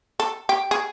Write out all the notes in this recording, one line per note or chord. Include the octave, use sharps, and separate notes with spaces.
A4
G4
G#4